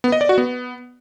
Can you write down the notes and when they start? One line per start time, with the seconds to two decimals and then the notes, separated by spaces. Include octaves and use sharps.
0.04 B3
0.12 D#5
0.21 D5
0.29 F#4
0.38 B3